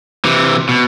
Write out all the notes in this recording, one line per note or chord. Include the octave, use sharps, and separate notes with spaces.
C3 E3
B2